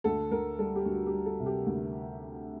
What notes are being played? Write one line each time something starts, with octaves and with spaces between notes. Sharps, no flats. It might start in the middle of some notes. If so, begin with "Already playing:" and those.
D2 A4
D2 A#4
G3 A4
G4
D2 F#4
G4
G3
A4
C3
G4
D2